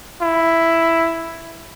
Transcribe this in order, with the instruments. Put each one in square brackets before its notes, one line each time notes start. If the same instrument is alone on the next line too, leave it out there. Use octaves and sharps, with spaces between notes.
[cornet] E4